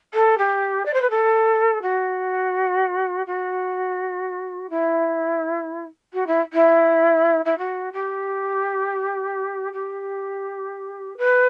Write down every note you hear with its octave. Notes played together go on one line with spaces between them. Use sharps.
A4
G4
D5
C5
B4
A4
F#4
F#4
E4
F#4
E4
E4
E4
F#4
G4
G4
B4